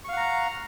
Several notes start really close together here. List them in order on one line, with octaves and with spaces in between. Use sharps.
C#6 F5 F#5 A#5